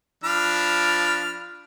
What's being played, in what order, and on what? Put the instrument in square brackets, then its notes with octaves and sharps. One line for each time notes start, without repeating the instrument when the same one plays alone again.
[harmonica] F3 B5 F6 [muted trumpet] D4